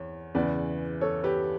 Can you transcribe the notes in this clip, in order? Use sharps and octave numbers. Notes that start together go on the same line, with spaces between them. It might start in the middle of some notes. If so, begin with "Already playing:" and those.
Already playing: E2 C#5
E2 C#3 E3 B4 D5
A4 C#5
G4 B4